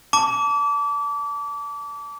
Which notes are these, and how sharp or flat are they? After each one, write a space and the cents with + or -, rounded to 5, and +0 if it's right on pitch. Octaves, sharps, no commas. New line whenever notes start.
A5 +10 D6 -30